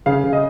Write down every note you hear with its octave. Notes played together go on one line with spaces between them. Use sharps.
C#3 F5
C#3
D#5